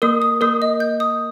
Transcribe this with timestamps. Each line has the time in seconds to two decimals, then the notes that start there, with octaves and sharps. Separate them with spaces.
0.02 A#3 A#4 D#6
0.22 D#6
0.41 A#3 A#4 D#6
0.62 D#5
0.80 G6
1.00 D#6